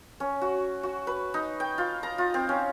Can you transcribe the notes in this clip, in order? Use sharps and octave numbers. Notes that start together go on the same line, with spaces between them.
C#4
F#4
F#4
B4
D#4
G5
F4
A#5
F4
C4
C#4